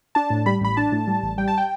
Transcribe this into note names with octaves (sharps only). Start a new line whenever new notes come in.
D4 A5
A2
G3 B5
A1 B5
D4 A5
A2
G3
A1
G3 G5
A5
G5